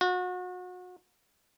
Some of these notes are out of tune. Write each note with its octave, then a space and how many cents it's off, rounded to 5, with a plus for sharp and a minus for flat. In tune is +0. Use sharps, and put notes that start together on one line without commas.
F#4 -35